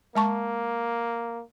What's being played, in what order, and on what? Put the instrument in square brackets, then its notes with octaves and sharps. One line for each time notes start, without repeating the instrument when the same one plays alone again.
[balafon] G#3 A5 C#6 [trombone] A#3